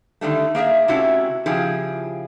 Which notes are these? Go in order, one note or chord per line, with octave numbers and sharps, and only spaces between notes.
D3 D#3 G3 A3
A#3 G#4 D5 E5
C3 A3 C#4 E4 F#4 G4
C#3 F3 E4 G4 G#4